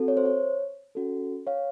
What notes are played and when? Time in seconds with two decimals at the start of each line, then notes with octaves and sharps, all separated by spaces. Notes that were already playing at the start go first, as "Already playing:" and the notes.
Already playing: C4 F#4 A4
0.08 C#5
0.17 C5
0.25 C#5
0.95 C#4 F#4 A4
1.47 C#5 F5